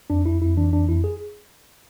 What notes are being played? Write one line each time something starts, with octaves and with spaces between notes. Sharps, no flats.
F2 D4
F2 E4
F2 E4
E3 D4
F2 D4
F2 E4
G#4